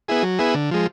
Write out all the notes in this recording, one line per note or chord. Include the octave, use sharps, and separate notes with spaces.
B3 E4 G#4
F#3
B3 E4 G#4
D3
F3 G#3